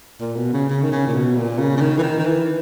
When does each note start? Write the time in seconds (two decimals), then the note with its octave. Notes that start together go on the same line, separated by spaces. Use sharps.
0.20 A#2
0.36 B2
0.53 C#3
0.70 C#3
0.83 D#3
0.92 C#3
1.07 A#2
1.14 B2
1.36 A#2
1.59 C#3
1.77 C#3
1.81 D#3
1.98 E3
2.03 D#3
2.19 D#3
2.26 E3